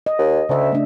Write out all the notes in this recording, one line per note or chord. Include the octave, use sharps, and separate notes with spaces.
D#5
D#2
D2 C#3 E5
A3 D4